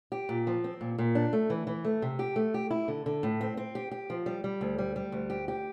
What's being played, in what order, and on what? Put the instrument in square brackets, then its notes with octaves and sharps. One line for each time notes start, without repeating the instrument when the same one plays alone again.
[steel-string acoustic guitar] G4
A#2
F3
C4
A#2
A#2
D4
A3
E3
E3
A3
C3
G4
A3
G4
E4
D3
D3
A2
C4
C4
G4
G4
F3
G3
G3
D2
G3
G3
D2
G4
G4